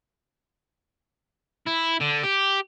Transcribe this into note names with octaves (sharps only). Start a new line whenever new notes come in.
E4
D3
G4